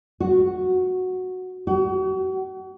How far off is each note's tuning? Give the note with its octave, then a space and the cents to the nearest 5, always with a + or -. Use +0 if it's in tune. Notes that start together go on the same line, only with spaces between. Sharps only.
F#4 -5
F#4 +40